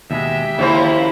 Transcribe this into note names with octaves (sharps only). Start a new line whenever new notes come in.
D#2 B2 G#3 G4 E5
D#2 C#3 F3 A#3 E4 C5